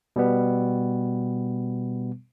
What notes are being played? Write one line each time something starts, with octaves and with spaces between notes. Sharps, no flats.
B2 G3 B3